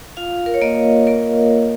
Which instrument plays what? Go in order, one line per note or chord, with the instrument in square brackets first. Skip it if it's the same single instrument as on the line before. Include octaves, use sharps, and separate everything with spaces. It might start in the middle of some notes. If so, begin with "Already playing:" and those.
[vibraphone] F4 F5
A#4
C#5
A#3 D#5
A#3 A#4